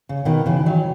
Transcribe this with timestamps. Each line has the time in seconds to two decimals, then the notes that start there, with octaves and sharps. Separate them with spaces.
0.09 C#3
0.25 B2 D#3
0.46 C#3 E3
0.66 D#3 F#3